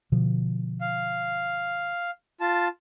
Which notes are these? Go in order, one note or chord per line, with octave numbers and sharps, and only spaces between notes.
B2 D3 F3
F5
F4 A5